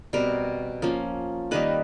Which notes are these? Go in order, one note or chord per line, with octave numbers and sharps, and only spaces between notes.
B2 G3 C4 A#4
F3 A#3 C#4
D#3 G3 A#3 D#4 B4